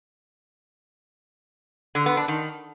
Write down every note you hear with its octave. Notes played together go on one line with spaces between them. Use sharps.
D3
B3
D4
D#3